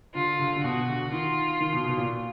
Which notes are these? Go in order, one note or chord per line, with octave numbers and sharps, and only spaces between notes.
D3 F4
D3
D3
B2 F#4
D3
D#3 F4
D#3
B2
B2
A#2